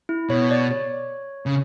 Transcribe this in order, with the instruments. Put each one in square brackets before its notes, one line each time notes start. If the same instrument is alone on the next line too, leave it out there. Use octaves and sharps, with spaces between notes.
[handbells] E4
[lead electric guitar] B2 [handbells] C#5
[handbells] D5
C#5
[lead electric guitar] C#3